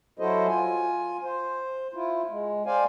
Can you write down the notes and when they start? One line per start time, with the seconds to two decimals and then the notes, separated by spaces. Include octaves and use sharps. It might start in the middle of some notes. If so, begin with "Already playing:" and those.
0.19 F#3 E4 F#4 A4 C5 D#5
0.47 F4 G#5
1.23 C5
1.94 E4 F4
2.30 G#3
2.66 C5 D5 F5 G5 G#5